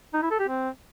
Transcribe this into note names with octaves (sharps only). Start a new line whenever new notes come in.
D#4
E4
A4
G4
C4